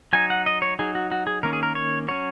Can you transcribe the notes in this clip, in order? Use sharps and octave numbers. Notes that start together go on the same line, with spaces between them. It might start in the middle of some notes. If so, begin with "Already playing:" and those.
F#3 D#4 G#5
F#5
D#5
C#5
F#3 D#4 G#4
F#4
F#4
G#4
D#3 A#3 C#4 A#4
G#4
A#4
C#5
F#3 C#4 C#5